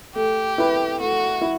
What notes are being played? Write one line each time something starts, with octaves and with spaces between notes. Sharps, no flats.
A3 G4
E4 B4
A3 F#4
E4